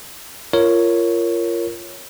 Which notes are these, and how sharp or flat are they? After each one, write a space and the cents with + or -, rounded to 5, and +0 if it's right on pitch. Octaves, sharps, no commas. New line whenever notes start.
F4 -20 A#4 +0 C#5 +0